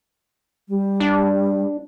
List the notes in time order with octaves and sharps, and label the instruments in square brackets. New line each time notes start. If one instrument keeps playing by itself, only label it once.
[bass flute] G3
[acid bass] D4